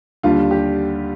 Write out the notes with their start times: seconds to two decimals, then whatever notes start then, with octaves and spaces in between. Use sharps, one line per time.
0.23 D#2 D3 G3 D4 F4
0.51 G4